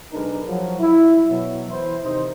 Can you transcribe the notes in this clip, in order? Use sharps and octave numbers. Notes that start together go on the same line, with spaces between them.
B1 G#3 D4 D#4 A#4 B4
F3 F#3
E4
B2 F#3
E3 E4 C5
C3 D#3 D#4 C5